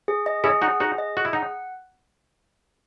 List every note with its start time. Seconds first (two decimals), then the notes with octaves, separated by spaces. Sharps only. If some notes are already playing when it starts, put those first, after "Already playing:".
0.08 G#4
0.26 D#5
0.44 C#4 E4 G#4
0.61 D#4 F#4 F#5
0.80 D#4 F#4 G#4
0.98 D#5
1.17 F#4 G#4
1.25 E4
1.33 D#4 F#5